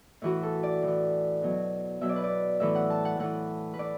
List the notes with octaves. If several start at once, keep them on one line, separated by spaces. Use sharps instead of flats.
A2 E3 F#4
A4
D5
A2
E3
B2 F#3
B2 F#3 E5
D5
B4
D5
A2 E3 E5
F#5
A5
F#5
A2 E3 F#5
B4
A2 D5